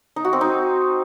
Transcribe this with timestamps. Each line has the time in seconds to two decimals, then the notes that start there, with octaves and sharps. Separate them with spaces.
0.16 D#4
0.25 F#4
0.33 C4
0.41 D#4